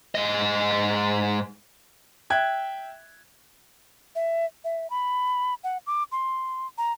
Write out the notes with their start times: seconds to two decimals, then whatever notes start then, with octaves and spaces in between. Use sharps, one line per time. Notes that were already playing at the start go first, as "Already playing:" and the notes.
0.15 G#2 D#5
2.30 E5 G5 F#6 G#6
4.15 E5
4.64 E5
4.90 B5
5.64 F#5
5.87 D6
6.12 C6
6.78 A#5